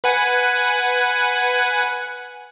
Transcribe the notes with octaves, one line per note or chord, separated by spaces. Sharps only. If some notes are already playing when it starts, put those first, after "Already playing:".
B4 F#5 G#5